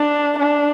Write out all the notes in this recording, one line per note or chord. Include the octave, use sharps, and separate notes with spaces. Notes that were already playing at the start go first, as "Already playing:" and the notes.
Already playing: D4
D4